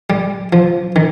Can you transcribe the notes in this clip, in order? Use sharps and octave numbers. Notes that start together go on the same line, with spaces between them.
G3
F3
D#3